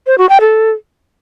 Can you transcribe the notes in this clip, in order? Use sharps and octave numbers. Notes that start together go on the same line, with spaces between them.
C5
F#4
G5
A4